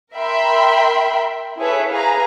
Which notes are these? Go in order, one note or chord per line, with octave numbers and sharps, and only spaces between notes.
A#4 E5 G5 B5 C6
E4 G#4 A4 B4 C#5 E5
G#4 B4 F5 A#5